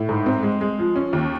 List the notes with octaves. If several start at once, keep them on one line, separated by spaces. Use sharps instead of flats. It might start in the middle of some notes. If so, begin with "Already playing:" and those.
Already playing: A2
G#2
C4
G#3
G#3
F3
C#4
D#2